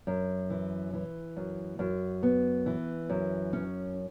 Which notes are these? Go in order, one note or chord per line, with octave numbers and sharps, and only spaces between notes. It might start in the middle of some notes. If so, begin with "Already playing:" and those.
F#2
E3
E3
F#2
F#2
B3
E3
F#2
C#4